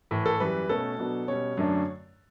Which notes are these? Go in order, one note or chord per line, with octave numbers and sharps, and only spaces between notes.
A2 E3 A3
A4
F#2 E3 G3 B4
B2 A3 C#4 A4
B2 F#3 B3 D4
B2 G3 C#4 C#5
F#2 D3 A3 D4